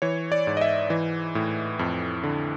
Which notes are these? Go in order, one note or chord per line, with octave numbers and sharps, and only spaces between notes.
E3 C#5
D5
G#2
D#5
E5
E3
A2
F2
D3